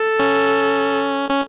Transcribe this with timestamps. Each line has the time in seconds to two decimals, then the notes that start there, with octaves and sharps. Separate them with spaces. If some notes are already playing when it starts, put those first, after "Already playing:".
Already playing: A4
0.20 C#4
1.30 C#4